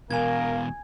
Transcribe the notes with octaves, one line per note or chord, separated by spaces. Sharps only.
E2 B2 A#4 F5 G#5 G#6